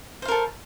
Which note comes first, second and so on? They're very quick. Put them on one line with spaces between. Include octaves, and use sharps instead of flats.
C5 F5 A#4 A4